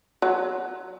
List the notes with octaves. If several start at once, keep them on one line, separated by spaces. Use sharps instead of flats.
F#3